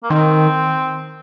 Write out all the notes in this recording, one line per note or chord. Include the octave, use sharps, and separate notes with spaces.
A#3
D#3 C4